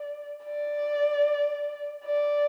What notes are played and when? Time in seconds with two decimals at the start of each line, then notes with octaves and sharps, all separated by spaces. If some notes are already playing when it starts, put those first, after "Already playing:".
Already playing: D5
0.45 D5
2.05 D5